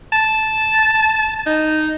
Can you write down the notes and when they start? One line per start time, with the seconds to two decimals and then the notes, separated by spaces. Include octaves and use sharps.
0.13 A5
1.46 D#4